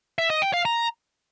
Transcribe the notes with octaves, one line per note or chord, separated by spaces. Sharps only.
E5
D#5
G5
F5
A#5